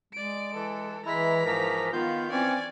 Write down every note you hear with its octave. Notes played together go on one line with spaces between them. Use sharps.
G#3 D5 D7
E3 A4
E3 G#3 E4 A#5 B6
G#2 E3 F3 A#4
D#3 B3 F4 F5 G6
E3 C4 C#4 C#5 D5 G#5